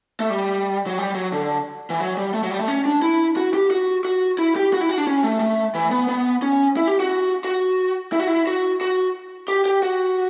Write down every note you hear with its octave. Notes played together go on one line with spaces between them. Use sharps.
A3
G3
F#3
G3
F#3
D3
E3
F#3
G3
A3
F#3
G3
A3
C#4
D4
E4
F#4
G4
F#4
F#4
E4
G4
F#4
E4
F#4
D4
C#4
A3
A3
E3
B3
B3
C#4
E4
G4
F#4
F#4
E4
F#4
E4
F#4
F#4
G4
G4
F#4